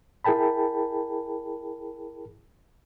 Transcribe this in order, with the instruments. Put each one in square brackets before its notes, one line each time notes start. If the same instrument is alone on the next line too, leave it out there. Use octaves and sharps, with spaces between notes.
[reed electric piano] E4 G#4 A#4 G5 A5 B5